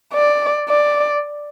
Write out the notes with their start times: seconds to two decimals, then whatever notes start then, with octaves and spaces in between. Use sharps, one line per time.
0.13 D5
0.68 D5